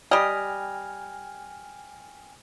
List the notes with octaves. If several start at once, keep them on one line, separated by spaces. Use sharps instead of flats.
G3 D#5 G5 G#5 F6